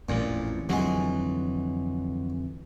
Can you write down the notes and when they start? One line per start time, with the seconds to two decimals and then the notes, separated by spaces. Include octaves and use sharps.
0.09 A1 F2 A#2
0.69 F2 D3 E3 F#3 G#3